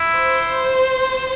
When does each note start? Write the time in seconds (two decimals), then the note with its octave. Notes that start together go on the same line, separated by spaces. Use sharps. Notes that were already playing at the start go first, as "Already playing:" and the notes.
Already playing: E4
0.16 C5